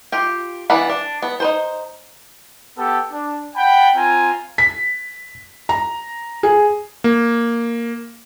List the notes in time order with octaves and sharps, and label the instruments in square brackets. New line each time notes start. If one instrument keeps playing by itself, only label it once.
[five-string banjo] F4 G4
E3 B3 D4 F#5 B5
D4
B3
D#4 B4 C5
[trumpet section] B3 G4 A4
D4
F#5 G5 A5 B5
C4 F4 G#5 A#5
[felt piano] B6
A#5
G#4
[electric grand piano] A#3